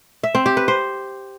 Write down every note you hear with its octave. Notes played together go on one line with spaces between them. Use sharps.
E5
C4
G4
B4
C5